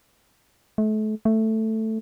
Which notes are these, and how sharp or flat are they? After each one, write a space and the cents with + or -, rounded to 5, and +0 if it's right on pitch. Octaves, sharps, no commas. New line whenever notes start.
A3 -35
A3 +5